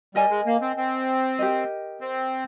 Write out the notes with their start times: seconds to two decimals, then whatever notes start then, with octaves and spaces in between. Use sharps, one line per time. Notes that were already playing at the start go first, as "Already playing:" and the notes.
0.15 G3 A#4 D#5 G#5
0.30 G#3
0.46 A#3
0.61 C4
0.77 C4
1.39 G4 A#4 D#5
2.01 C4